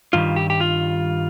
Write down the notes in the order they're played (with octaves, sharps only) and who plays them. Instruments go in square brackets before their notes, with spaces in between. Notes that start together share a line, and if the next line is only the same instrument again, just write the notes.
[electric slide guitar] G2 D#3 G3 F4
G4
G4
F4